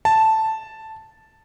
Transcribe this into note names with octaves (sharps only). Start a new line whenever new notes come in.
A5